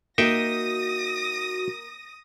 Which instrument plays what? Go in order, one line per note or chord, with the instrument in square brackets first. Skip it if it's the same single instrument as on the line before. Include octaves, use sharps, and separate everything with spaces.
[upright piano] A#3 [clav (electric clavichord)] D#4 E5 G5 [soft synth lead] F#4 [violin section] D#6 A#6